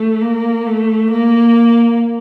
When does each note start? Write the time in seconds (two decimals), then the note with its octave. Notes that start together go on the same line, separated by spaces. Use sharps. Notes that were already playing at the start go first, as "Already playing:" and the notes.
Already playing: A3
0.21 A#3
0.67 A3
1.12 A#3